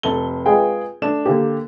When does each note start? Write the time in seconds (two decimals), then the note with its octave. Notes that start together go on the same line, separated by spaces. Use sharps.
0.03 F1 A4 G7
0.46 G#3 F4 G#4 B4 G5
1.02 A3 D4 E7
1.26 D3 A#3 G4